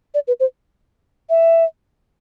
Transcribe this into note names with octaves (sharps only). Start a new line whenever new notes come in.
D5
B4
C5
E5